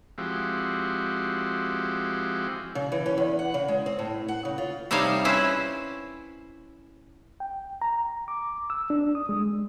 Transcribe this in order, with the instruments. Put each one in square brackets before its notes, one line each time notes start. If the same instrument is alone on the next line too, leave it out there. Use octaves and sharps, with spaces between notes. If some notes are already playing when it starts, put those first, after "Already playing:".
[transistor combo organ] F3 G#3 C4 E4 F#4 G4
[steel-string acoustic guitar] C#3
E3
C#4
E2
F#5
C#3
G#3
C4
A2
F#5
C#3
F4
[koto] C3 G3 D#4 C#5 F5 A5
C#4 E4 B4 C5
[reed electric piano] G5
A#5
D6
E6
D4
D#6
G#3